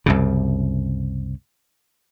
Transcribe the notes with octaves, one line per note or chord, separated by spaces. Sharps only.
C2 F#2 C#3